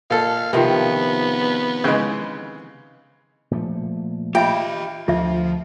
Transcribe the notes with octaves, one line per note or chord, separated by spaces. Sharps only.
A#2 A4 F5
C3 D#3 F3 B3
C#3 E3 G#3
A#2 F3 A3
F4 G4 D#5 E5 G5 B5
D2 D3 F3 F4 E5